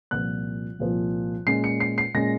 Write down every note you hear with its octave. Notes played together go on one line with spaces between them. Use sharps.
C2 A#2 F3 F#6
C2 A#2 F3
A#2 G#3 C#4 C7
C#7
C7
C7
A#2 G#3 C#4 A#6